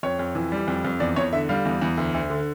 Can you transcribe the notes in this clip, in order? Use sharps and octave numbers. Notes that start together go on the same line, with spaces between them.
F2 C#5
F2
E3
G3
F2
F2
E2 D5
E2 C#5
D3 E5
G3 F5
E2
E2
D2
D2
D3